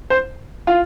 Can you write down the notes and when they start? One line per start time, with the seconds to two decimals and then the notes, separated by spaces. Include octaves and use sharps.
0.10 C5
0.67 F4